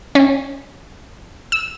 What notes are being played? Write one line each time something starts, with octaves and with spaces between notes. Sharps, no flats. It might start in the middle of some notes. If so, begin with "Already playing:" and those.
C#4
E6